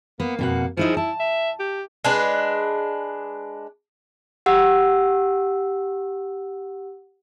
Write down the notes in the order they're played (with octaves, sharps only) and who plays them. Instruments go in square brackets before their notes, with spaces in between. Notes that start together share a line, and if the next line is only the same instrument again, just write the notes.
[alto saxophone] A#3 [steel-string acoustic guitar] B3
[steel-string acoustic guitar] F2 B2 F#5
[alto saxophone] F3 [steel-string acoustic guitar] D#4 E4 G#4
[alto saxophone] E4 [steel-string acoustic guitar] A5
[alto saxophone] E5
G4
[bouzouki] G#3 D4 B4
[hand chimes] G4 F#5 E6